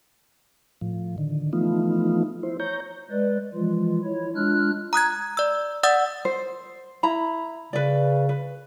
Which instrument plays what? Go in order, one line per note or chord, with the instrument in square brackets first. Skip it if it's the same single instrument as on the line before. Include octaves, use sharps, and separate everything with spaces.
[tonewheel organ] A2 F3
D3 D#3
E3 F3 A3 B3 D#4 F4
E4 C5
C#5 A#5 G6
[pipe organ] G#3 B4 D5
E3 F3 G#3 F4
E4 C#5
G#3 D4 F4 F6 F#6
[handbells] A#5 D#6 F#6 G#6
D5 E6
D5 F#5 D#6 E6 A6
[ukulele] C5
E4 A#5 B5
[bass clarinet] C#3 [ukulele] B4 D5
[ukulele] B4